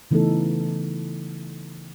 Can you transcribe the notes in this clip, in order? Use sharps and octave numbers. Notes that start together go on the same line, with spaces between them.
C#3 E3 A3 B3 D#4 A4